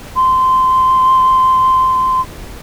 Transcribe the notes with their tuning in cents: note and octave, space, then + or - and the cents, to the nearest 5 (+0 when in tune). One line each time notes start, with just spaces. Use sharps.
C6 -15